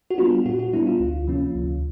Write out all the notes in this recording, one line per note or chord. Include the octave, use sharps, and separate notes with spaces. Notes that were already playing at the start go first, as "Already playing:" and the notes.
F#4
G3 B3 D4 F4
A#2 F#4
F#4
G3 B3 D4 E4
F4
D2
C3 F3 A#3 C#4
D2